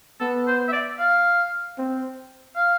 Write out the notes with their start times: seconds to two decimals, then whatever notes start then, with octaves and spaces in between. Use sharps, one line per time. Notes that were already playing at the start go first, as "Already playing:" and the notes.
0.20 B3 A4
0.47 C5
0.68 E5
0.72 D5
0.99 F5
1.78 C4
2.56 F5